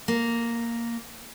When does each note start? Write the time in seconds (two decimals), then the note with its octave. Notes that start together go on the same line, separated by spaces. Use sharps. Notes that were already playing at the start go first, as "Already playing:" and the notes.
0.08 A#3